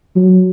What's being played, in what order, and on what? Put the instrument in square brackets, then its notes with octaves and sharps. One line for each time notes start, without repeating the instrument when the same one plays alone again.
[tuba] F#3